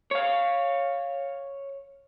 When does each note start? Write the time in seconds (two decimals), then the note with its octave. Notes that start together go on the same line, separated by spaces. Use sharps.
0.11 C#5 F5